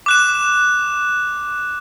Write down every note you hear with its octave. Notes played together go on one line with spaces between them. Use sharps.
D6 F#6 E7